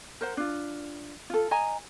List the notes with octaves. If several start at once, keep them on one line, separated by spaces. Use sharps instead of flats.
A#4 C5 F#5
D4 F4
F4 A4
D#5 G#5 A#5